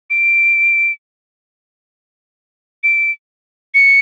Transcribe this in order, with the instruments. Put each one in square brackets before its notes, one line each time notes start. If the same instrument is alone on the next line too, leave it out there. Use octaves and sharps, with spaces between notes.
[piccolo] D7
D7
C#7